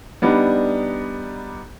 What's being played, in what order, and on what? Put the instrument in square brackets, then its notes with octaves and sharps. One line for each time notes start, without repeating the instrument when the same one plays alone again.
[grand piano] G3 B3 D4 D#4